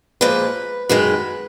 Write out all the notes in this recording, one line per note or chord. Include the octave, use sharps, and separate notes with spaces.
A#2 F3 G#3 B4
F#2 D#3 G#3 B4